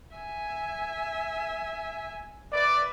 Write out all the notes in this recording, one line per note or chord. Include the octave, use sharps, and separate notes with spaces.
E5 G#5
B4 D5 E5